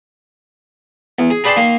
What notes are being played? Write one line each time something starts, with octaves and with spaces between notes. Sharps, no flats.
E2
G#4
G#4 B4 D5 G5 A5 C6
D#3 A#3 C6